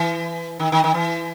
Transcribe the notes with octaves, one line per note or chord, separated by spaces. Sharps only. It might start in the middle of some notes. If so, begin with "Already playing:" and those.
Already playing: E3
D#3
D#3
D#3
E3